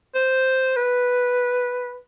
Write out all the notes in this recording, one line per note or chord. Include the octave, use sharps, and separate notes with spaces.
C5
B4